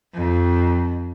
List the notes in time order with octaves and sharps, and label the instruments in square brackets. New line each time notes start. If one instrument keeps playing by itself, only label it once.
[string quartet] F2